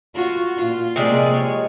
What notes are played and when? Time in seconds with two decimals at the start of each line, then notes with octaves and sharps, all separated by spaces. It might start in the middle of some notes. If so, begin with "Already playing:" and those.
0.14 F4 F#4
0.57 A#2 F4
0.96 C3 F3 G#3 A#3 G#4 D5
1.35 C#5